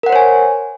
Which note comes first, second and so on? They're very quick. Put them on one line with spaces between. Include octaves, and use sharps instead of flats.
A#4 F#5 C5 C#5 G#5